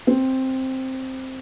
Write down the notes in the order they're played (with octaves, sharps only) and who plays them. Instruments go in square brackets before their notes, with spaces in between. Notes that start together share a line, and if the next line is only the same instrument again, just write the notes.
[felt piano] C4